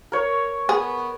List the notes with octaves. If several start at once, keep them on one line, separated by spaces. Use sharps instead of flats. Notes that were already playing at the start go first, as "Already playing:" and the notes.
A#4 C#5
B3 G#4